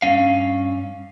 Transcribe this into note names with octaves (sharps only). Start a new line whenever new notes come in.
G2 C#4 F5